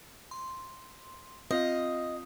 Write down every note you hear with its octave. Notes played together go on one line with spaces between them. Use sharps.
C6
C4 F4 D#5 F5